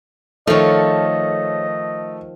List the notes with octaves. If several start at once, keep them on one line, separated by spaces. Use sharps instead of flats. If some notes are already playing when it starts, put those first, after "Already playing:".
D#3 F3 A3 A4 C#5 D#5